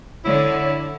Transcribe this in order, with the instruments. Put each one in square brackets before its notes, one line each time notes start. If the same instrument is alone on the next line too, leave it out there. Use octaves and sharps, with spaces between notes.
[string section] D3 [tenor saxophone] E4 [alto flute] C#5